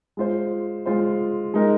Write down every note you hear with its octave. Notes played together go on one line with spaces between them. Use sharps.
G#3 F4 C5
G#3 F4 C5
G#3 D#4 A#4